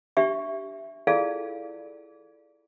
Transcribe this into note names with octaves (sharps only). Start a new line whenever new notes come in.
D4 G4 E5 C#6
E4 F4 G#4 A4 D5 F5